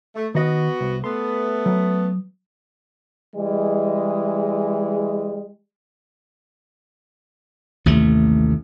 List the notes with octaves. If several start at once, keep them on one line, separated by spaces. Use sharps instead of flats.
A3
D#3 B3 F#4 D#5
C2
A3 B3 C6
F#3
E3 G3 G#3
A1 D#2 C3 A3